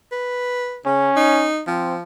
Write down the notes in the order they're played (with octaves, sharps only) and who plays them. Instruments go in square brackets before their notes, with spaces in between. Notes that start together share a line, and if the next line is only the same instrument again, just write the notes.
[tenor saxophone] B4
[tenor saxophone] C#3 [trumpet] C#4
[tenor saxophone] D#4
[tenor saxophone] F3 [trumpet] C4